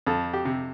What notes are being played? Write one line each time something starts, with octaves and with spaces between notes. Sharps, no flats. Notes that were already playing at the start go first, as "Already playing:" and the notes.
F2 A4
G4
C3